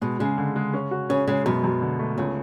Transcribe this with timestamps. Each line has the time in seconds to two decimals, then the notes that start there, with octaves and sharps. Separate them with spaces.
0.01 B2 G#3
0.20 C#3 G#3
0.38 D3
0.56 G#3
0.73 C#4
0.91 F#4
1.09 C#3 C#4
1.27 C#3 G#3
1.46 F#2 B2
1.64 F#2
1.81 D3
1.99 A3
2.18 C#2 C#3